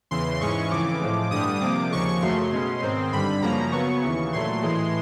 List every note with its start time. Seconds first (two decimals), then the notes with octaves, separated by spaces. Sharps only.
0.11 E2 C#3 E3 C6
0.41 G#2 E3 G#3 C#4 C#6
0.71 F2 C#3 E3 D6
1.01 A2 F3 G#3
1.31 G2 D3 G3 D#6
1.61 C3 F3 A#3 D6
1.91 D#2 C#3 F3 G#3 C#6
2.22 F#2 C#3 F#3 A3 C6
2.52 B2 G#3 C#4
2.82 G#2 D#3 G#3 C4
3.13 G2 D3 G3 B5
3.42 F#2 C#3 F3 A#3 C#4 A#5
3.72 C#3 F#3 B3 C#6
4.02 D#2 C#3 E3
4.33 A#2 F#3 A3 C6
4.62 A2 E3 G#3